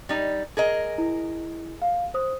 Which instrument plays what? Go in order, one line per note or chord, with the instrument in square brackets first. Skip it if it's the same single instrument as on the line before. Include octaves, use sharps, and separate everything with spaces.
[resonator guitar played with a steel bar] G3 D#4
G#4 A#4 D#5
[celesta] E4
F5
C5 D#6